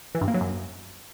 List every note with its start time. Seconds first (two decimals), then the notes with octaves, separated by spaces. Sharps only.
0.15 E3
0.21 G2
0.28 A#3
0.34 F#3
0.41 F#2